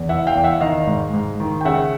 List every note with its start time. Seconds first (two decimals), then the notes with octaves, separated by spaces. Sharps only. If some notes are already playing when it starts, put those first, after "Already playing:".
Already playing: E2
0.09 E3 E5 F#5
0.27 F5 G5
0.35 E2
0.44 E5 F#5
0.61 D#3 D#5 F5
0.87 G#2
1.14 G#2
1.40 D#3
1.61 G5
1.65 C#3 E5 F#5